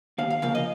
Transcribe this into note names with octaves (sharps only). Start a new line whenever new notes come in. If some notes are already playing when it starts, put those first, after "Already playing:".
D#2 F5
F5
C#3 F3 A#3 F5
D#5